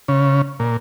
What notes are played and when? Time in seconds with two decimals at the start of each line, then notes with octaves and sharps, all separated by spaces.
0.08 C#3
0.60 A#2